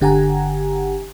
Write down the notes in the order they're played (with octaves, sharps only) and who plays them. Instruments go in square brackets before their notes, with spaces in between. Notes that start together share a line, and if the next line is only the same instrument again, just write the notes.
[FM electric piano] G1 D3 G4 F#5 G#5 A#5